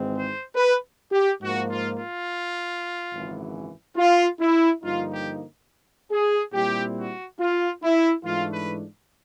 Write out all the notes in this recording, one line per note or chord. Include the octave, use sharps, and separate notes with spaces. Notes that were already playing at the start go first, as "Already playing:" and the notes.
Already playing: G#1 G#2 E3 G#3 C4
C5
B4
G4
G#2 F3 A#3 F#4
F4
F4
G#1 F#2 C#3 E3
F4
E4
G2 D3 F3 A#3 D#4 F4
G4
G#4
A#2 G3 C4 E4 G4
F#4
F4
E4
G#2 E3 A3 D4 F4
B4